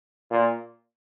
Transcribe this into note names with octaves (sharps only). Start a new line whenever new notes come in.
A#2